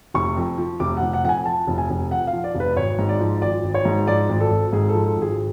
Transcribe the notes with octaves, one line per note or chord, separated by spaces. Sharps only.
F1 C#6
F2
F3
F1 D6
F1 F#5
F#5
F2 F#5
G#5
F3 A5
F1
G#5
F1
F2 F#5
F5
F3
D5
F1
B4
G#1 C#5
G#2
D5
F3
G#1 D5
G#1
C#5
G#2
F3 D5
G#1
A4
G#1
G#2 G#4
A4
F3
A4
G#1
G#4